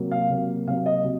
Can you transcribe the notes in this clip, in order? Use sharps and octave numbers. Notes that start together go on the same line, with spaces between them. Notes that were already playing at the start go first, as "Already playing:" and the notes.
Already playing: C3 F#3 A#3
F5
C3 F#3 A#3
C3 F#3 A#3 F5
D#5
C3 F#3